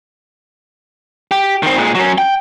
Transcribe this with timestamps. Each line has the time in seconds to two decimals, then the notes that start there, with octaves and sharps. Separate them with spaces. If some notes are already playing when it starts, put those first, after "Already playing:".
1.31 G4
1.63 D#3 C4
1.76 A#2 G#3
1.95 F#3 C#4
2.18 G5